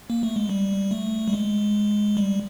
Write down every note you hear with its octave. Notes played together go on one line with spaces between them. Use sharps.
A#3
A3
G#3
G3
A3
G3
G#3
G3